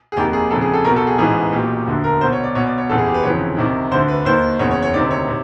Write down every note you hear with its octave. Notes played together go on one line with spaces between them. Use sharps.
G#4
F1 D#2 D#3 G4
G#4
F1 F2 C#3 A4
G#4
A4
B1 B2 A#4
A4
G#4
A1 G#2 E3 G#4
B1 A#2 G4
E1 D2 D3
A#4
B1 B2 C5
C#5
D5
B1 B2 C#5
D5
C#5
F#1 E2 C#3 A4
G#4
G4
B4
G1 F2 C#3 E3 C#5
C2 C3 D#3
D2 D3 C5
B4
D#2 D#3 C5
F#1 E2 C#3 C#5
C#5
C#5
D2 C3 D#3 D5
C#5
C3